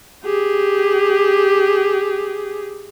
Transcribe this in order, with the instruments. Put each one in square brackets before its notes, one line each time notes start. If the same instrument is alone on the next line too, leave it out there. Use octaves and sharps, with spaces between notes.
[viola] G4 G#4